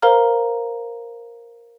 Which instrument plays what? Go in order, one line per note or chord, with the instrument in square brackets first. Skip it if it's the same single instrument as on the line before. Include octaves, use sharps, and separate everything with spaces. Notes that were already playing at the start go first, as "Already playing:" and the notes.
[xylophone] A#4 C5 F5 A#5 F6